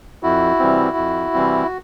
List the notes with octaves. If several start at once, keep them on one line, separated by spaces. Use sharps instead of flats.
F2 E4 F#4
C3 E3 G3 C4
F2
C3 E3 G3 C4